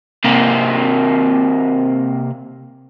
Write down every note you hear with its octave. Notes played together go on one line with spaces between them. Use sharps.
C3 A#3